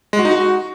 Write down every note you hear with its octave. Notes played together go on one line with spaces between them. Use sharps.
G#3
F#4
D#4
F#4